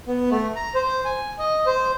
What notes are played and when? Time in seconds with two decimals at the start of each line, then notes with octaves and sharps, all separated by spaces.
0.07 B3
0.31 A3
0.56 A#5
0.74 C5
1.05 G#5
1.39 D#5
1.66 C5